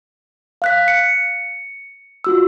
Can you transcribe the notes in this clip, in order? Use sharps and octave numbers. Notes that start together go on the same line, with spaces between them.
F5 F#6 B6
C#7
F4 F#4 E6